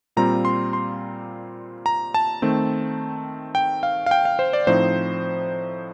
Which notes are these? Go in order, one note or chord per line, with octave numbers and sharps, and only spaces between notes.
A#2 G3 C4 F4 A#5
C6
C6
A#5
A5
D#3 A3 C4
G5
F5
F5
G5
F5
C5
D5
A2 F3 C4 D#4 C5